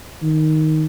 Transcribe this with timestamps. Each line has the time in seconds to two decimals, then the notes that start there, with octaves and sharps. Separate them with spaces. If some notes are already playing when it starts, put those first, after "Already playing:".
0.23 D#3